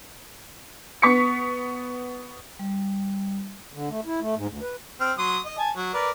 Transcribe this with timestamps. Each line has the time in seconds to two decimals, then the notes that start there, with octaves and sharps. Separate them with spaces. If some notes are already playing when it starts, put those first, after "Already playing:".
1.02 B3 C#6 B6 C#7
2.59 G3
3.73 D3
3.90 A3
4.05 E4
4.21 A3
4.36 G#2
4.48 D2
4.61 B4
5.00 C4 F6
5.18 F#3 C6 D#6
5.45 D#5
5.58 G#5 A5
5.76 F#3
5.93 A#4 B4 D5